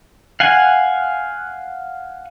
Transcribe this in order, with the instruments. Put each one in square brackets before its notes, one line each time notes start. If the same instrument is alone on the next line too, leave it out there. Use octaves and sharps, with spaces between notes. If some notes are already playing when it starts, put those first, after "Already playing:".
[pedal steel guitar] F5 F#5 G#5